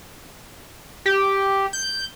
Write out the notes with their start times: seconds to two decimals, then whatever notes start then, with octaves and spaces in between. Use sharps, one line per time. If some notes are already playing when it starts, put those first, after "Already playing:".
1.06 G4
1.73 G6